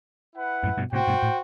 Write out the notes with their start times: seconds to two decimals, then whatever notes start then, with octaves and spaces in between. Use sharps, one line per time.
0.34 E4 B4 F#5
0.63 F#2 A2
0.78 G2 B2
0.92 A2 C3 F#4 C5 G5
1.08 G2 B2
1.23 A2